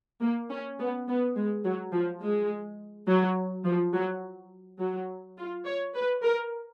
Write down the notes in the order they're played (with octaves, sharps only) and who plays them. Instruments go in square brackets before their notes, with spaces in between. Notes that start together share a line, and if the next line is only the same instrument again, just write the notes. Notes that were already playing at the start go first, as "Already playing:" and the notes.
[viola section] A#3
C#4
B3
B3
G#3
F#3
F3
G#3
F#3
F3
F#3
F#3
F4
C#5
B4
A#4